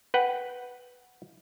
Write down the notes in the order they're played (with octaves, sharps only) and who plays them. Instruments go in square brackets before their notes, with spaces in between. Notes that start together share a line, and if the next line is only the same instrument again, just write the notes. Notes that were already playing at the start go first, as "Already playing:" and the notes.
[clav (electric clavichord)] B4 F#5 G5